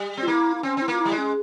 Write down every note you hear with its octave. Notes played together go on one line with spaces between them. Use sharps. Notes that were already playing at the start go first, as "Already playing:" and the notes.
Already playing: G3
C4
F4
A#3 E4
E4
C4 C#4
C4 E4
A#3 F4
E4
G3
G#3
C#4